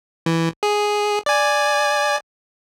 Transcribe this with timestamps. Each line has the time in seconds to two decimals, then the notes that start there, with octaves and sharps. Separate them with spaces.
0.26 E3
0.63 G#4
1.26 D5 G#5